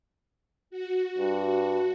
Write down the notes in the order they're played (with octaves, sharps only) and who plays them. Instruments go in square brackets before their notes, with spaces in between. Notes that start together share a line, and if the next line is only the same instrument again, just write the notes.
[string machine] F#4
[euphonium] G2